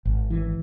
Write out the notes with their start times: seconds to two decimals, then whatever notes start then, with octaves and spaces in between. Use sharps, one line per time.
0.05 G#1
0.30 E3